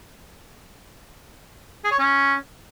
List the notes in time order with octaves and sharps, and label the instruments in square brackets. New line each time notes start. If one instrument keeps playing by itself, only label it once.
[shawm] G#4
C#5
C#4